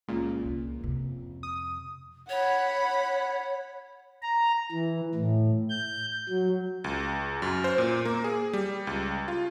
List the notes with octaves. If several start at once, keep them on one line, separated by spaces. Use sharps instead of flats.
C#2 A#2
C2 D#3
F2 C3
D#6
C#5 F#5 B5
A#5
E3
A2
G6
F#3
C#2
F#2
C5
A#2
A#3
G#4
G3
C#2
F4